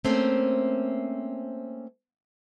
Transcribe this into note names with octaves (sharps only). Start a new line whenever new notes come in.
A3 A#3 C4 C#4 C5